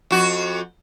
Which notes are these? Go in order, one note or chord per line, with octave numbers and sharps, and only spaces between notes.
F2 F#4